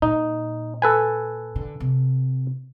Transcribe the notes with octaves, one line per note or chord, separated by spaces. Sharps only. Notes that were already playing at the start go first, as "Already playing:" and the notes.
A#2 D#4
A4 B4 G#5
D3
C3